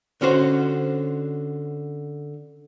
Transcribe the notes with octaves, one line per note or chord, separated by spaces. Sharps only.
D3 C#4 F#4 C5